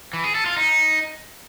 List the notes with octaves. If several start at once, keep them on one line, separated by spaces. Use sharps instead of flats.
E3
G#4
A4
F4
D#4